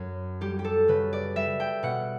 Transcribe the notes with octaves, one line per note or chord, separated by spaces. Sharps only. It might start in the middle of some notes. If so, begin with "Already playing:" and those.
Already playing: F#2
G3 G4
G4
A4
C#3 B4
D5
G3 E5
G5
B2 F#5